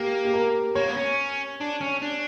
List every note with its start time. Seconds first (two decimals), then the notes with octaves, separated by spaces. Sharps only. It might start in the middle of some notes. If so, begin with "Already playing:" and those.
Already playing: A#3 G4
0.25 G4
0.34 A#4
0.75 A#3 C#5
0.88 B3
0.97 C#4
1.60 D4
1.81 C#4
2.02 D4